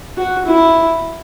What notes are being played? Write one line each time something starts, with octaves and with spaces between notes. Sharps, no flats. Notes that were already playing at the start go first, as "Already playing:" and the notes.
F#4
E4